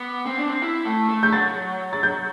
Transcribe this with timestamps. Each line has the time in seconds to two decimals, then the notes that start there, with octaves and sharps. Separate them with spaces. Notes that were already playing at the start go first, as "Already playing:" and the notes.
Already playing: B3 D6
0.26 C4
0.37 D4
0.48 C4
0.62 E4
0.85 A3
1.09 A3
1.23 G6
1.33 F#3 A6
1.93 A6
2.03 G6